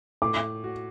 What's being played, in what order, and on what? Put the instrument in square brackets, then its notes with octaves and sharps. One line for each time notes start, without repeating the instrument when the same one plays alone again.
[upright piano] A2 [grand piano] D6
[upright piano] F#4